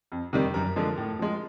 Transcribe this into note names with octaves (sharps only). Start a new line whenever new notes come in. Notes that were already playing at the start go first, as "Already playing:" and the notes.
F2
C3 D#3 G3
F#2 A#4
D3 F3 G#3
A2
F3 G#3